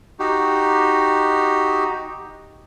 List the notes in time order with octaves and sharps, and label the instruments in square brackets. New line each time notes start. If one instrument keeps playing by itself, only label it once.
[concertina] D#4 F#4 G4